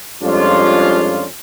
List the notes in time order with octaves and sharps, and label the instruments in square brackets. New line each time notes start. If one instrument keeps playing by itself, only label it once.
[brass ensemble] F2 G3 G#3 C#4 D4 F4